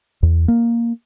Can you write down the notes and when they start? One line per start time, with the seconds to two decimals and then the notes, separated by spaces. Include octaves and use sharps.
0.23 E2
0.48 A#3